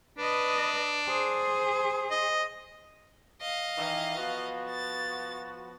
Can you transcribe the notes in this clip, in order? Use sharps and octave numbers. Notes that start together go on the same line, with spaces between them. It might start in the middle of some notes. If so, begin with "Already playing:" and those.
D4 B4 D#5
G#4 C5
D#5
D#5 F5
D#3 E3
F3 B3 F#4
A6